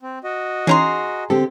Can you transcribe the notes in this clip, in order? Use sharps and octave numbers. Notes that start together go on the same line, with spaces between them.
C4
F#4 D#5
E3 C#4 D#4 G#4 A#5 C6
D3 C4 G4 A4